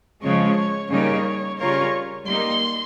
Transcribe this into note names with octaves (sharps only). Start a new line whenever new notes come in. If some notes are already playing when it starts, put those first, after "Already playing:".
C#3 F3 G#3 C#5
C#5
C#3 G3 A#3 D#4 A#4 C#5
C#3 G3 C#4 F4 A#4 C#5
G3 A#3 D#4 C6